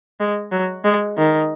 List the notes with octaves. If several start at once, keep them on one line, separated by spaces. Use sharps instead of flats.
G#3
F#3
G#3
D#3